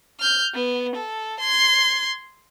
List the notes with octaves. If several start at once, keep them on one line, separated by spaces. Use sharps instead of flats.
F6 G6
B3
A4
C6 G#6